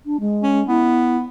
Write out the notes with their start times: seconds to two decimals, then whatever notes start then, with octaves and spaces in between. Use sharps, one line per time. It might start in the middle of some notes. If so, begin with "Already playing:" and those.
0.06 D4
0.20 G#3
0.43 C#4
0.68 B3 E4